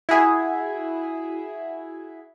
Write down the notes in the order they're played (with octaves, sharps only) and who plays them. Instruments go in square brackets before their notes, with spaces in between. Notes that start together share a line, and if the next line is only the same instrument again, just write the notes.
[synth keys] E4 F#4 G#4 E5